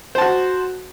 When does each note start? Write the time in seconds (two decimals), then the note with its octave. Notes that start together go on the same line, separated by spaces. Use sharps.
0.15 C5
0.18 A5
0.21 F#4